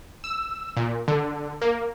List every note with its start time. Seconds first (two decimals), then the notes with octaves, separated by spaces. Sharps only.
0.24 E6
0.77 A#2
1.08 D3
1.62 A#3